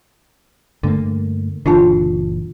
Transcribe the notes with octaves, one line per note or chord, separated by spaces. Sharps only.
G2 D3 A3 A#3
F#1 A#2 D3 E3 D4 F4 A5